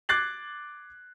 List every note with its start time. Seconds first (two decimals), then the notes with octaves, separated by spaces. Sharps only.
0.09 D6 F#6 G#6 A6 C7 F#7